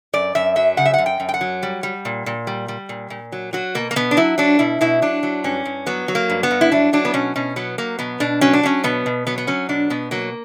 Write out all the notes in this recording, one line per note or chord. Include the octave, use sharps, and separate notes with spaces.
F#2 D5
F#2 E5
F#3 E5
C#3 F#5
E5
F#2 F#5
G5
F#2
G5
F#5
F#3
G3
G3
A#2
A#2
G3
G3
A#2
A#2
F#3
F#3 F#4
B2 A#3
A#3
B2 B3
D4
F#3 E4
F#3 D4
B2 E4
B2 E4
F#3 D4
F#3
G2 C#4
G2
F#3 B3
F#3
A#3
G2
B3
G2
E4
F#3 D4
F#3 D4
B3
B2 C#4
B2 C#4
F#3 B3
F#3 A#3
B2 B3
B2 D4
F#3 C#4
D4
F#3 C#4
B2 B3
B2
F#3 B3
B3
F#3 C#4
B2 D4
B2 B3
F#3 A#3